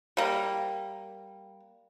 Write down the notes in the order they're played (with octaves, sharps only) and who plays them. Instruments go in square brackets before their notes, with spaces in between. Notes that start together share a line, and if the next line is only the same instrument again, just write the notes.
[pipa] G3 A#3